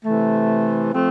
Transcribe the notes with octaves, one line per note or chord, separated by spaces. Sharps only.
C3 E3 A3
F3 A3 C4